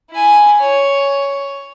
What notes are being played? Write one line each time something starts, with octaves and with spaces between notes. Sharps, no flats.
E4 G#5
C#5